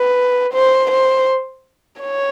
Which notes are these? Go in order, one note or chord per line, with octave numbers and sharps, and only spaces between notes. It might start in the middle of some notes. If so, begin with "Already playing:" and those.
Already playing: B4
C5
C5
C#5